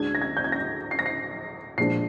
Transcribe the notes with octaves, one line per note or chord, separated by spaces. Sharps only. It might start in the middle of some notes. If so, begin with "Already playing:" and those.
Already playing: D2 D3 G#3 D4 G#6
A#6
G#6
G6
G#6
A#6
C7
A#6
C7
A#2 F3 G#3 D4 C7